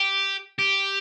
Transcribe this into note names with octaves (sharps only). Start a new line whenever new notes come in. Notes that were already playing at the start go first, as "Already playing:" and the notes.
Already playing: G4
G4